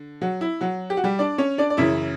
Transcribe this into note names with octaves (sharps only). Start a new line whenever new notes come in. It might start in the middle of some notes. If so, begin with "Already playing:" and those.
Already playing: D3
F#3 F#4
E4
F#3 F#4
G4
F#4
G3 G4
D4 D5
C#4 C#5
D4 D5
D5
F#2 C#3 E3 E4 E5